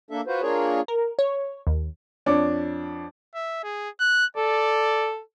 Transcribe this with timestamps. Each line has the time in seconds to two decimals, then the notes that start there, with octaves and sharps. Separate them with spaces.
0.11 A#3 D4 A4 E5
0.27 F4 F#4 B4 C5
0.42 A#3 D4 F4 G#4 A#4 C#5
0.88 A#4
1.19 C#5
1.67 D#2
2.26 F2 D4 C#5 D6
3.35 E5
3.64 G#4
4.00 F#6
4.37 A4 D5